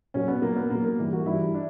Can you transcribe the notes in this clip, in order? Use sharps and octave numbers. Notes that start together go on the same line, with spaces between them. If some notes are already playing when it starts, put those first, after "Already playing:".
A#2 F#3 C#4
B3
A#2 F#3 A#3
B3
A#2 F#3 A#3
A#3
G2 E3 G3
F#4
G2 E3 G3 E4
D4